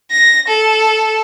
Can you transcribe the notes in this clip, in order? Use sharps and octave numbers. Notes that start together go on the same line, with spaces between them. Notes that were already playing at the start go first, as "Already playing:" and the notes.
A#6
A4